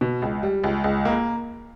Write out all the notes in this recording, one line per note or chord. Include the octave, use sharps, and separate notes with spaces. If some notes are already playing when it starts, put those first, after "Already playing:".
B2
C#2
G3
C#2
C#2
A#3